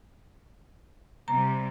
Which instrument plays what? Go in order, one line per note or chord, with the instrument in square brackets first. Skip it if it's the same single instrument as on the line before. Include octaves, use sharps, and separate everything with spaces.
[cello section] C3 G3 [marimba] A#5